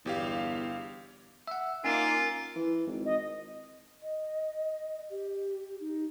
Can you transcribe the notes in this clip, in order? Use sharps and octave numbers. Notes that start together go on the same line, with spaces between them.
G1 E2 G4 F5
E5 F#5 E6
A#3 C#4 D#4 F4 G#5 D6
E3
G#1
D#5
D#5
G4
D#4